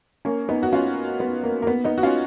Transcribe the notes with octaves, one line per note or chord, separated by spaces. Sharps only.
A#3 C#4
B3 D#4
F#4
C#4 F4
B3
A#3
A#3
B3
B3 D#4
F#4
C#4 F4